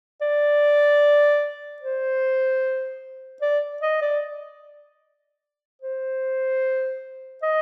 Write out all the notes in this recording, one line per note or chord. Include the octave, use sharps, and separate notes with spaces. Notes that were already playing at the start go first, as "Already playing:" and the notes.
D5
C5
D5
D#5
D5
C5
D#5